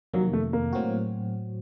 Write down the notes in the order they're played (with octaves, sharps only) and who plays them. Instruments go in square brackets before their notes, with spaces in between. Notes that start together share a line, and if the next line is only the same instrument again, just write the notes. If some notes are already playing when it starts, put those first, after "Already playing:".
[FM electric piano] F2 C3 D#3 A#3 [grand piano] F#3
[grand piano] A3
A#3
[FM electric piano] A2 F#3 C4 F#4